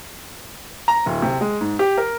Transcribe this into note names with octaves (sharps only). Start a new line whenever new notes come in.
A#5
D1
C3
G#3
G#2
G4
A#4